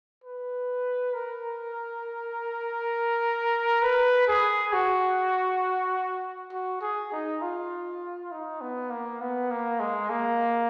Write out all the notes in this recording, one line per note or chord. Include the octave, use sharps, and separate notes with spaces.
B4
A#4
B4
G#4
F#4
F#4
G#4
D#4
F4
D#4
B3
A#3
B3
A#3
G#3
A#3